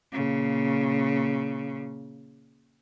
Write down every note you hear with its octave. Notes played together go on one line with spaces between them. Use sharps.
A#2 C#3